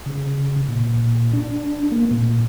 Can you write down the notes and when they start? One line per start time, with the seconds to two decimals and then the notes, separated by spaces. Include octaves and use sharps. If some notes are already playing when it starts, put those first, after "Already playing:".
0.06 C#3
0.68 A#2
1.33 D4
1.92 A#3
2.11 A#2